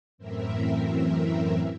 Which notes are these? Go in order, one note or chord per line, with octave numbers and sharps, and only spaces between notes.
F#2 A2 E3 C4 A#4 E5